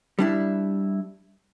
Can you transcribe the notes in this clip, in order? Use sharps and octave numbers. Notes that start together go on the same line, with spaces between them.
G3 D4 E4